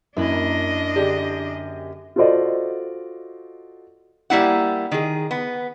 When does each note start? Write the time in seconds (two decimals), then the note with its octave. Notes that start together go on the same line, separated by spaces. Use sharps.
0.17 F#2 E3 A#3 D4 D#5 B5
0.96 D3 G4 G#4
2.16 F4 F#4 A4 C5 D5 D#5
4.30 G3 A#3 E4 F#5
4.91 D#3 G#4
5.31 B3